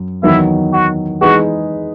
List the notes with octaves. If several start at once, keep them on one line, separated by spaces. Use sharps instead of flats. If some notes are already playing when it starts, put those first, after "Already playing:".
Already playing: F#2
E2 D#3 F#3 B3 D#4 E4
F#4
E3 G#3 D#4 F#4 G#4 B4